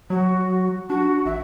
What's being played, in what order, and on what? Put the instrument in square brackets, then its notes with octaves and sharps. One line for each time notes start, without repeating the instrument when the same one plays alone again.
[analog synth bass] F#3 [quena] F#4
[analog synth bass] D4 [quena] F#4
[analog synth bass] A1 [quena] E5